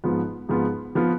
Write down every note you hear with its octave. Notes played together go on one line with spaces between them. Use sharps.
G#2 F3 B3 F4
G#2 F3 B3 F4
F3 B3 F4